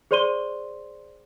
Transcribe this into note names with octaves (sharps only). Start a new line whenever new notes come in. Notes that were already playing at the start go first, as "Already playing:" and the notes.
G#4 C5 D5 C6 D#7 G7